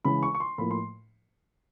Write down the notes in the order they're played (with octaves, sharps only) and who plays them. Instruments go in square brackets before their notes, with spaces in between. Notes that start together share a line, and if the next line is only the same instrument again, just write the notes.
[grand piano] C#3 E3 G#3 B5
C#6
C#6
C6
A2 F3 A#3 B5
C6